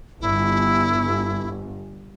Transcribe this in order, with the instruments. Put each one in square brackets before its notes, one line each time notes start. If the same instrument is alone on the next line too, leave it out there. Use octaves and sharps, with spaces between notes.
[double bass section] G1 [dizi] E4